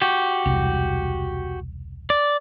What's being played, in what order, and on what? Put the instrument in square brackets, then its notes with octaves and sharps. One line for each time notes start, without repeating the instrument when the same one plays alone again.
[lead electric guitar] F#4 G4
[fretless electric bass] E1 C2
[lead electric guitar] D5